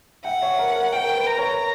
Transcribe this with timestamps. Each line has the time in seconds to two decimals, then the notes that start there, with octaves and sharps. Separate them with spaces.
0.25 E5 F#5 G5
0.42 C#5 E5
0.59 A#4
0.76 A#4
0.93 A#4 G5
1.16 B4
1.27 A#5
1.37 A#4 C#5